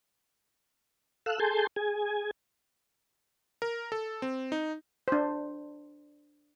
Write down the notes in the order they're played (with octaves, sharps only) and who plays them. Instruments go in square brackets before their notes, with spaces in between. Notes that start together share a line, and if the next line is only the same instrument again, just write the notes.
[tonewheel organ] A4 F5 E6 F#6
G#4 A4 G#5 A5 C6 G6
G#4 G#5
[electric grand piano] A#4
A4
C4
D#4
[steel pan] D4 C5